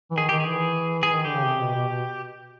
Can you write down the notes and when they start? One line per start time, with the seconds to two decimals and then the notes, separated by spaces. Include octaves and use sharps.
0.11 E3
0.17 D#3 G#4
0.29 D#3 G4
0.40 G#4
0.46 E3
1.03 E3 G#4
1.14 D#3
1.25 D3 G4
1.35 C#3
1.45 C3
1.61 B2
1.74 B2
1.88 B2